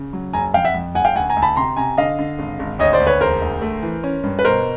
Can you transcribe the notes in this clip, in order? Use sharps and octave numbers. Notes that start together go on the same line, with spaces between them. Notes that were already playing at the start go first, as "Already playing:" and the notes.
Already playing: C#3
F#3
F#1 G#5 A#5
F2 F5 G5
E5 F#5
F2
F#1 F#5 G#5
F5 G5
D2 F#5 G#5
G#5 A#5
D2
A5 B5
C3 A#5 C6
C3 G#5 A#5
D3 D#5 F5
D3
G#1
G#1
D2 C#5 D#5
C5 D5
D2
B4 C#5
E1 A#4 C5
D2
A3
E3
C#4
G2
B4
B2 A#4 C5